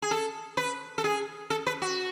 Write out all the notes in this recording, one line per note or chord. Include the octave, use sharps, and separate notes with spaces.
G#4
A4
B4
A4
G#4
A4
B4
F#4